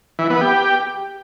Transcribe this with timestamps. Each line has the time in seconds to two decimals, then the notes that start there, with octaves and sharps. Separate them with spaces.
0.19 E3
0.30 B3
0.41 G4